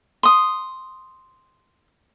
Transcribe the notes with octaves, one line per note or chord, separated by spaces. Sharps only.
C6 D#6